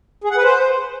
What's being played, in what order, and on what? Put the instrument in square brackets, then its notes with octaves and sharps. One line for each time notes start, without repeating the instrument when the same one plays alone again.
[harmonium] G#4
F#5
B4
C5